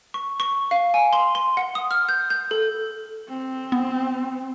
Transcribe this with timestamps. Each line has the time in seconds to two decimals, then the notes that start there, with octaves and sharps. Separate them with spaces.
0.14 C#6
0.40 C#6
0.71 F5
0.94 G#5
1.13 C6
1.35 C6
1.57 F#5
1.75 D#6
1.91 F6
2.09 G6
2.30 G6
2.51 A4
3.29 C4
3.72 B3